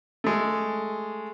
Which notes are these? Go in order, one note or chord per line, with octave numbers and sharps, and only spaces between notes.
G#3 A3